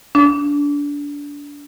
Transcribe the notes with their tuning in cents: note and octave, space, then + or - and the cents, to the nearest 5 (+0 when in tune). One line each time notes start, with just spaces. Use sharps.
D4 -25